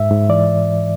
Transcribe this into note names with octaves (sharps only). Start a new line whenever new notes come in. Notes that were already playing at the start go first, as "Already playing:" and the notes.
Already playing: G#2 E5
G#2
E3 D5